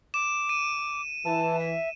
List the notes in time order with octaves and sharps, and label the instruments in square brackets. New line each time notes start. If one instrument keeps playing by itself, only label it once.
[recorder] D6 [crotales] E7
[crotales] D#7
[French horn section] E3 [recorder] A5
[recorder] E5